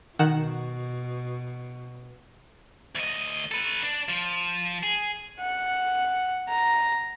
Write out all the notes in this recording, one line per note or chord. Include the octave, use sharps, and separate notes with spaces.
B2 D#3 F#5 E7
D2 D#5
A4 B4
D4
F3
G#4
F#5
A#5